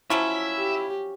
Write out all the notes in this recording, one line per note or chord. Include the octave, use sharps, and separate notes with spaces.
F3 F#3 C#4 E4 E5
G4